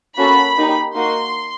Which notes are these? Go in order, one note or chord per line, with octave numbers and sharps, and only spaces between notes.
A#3 C#4 F#4 A4 B5
A#3 D#4 G4
A#3 D#4 F#4 C6